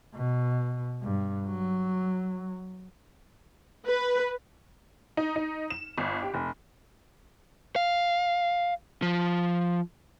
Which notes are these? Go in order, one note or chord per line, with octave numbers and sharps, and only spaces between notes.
B2
G2
F#3
B4
D#4
D#4
E7
G1
G4
F1
F5
F3